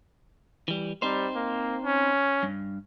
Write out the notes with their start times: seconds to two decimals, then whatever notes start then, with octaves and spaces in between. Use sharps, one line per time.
0.68 E3 G3
1.02 G3 C4 D#4 C5
1.35 A#3
1.84 C#4
2.43 G2